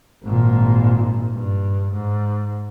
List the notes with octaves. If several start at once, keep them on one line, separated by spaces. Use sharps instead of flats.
G#1 A#2
G2
G#2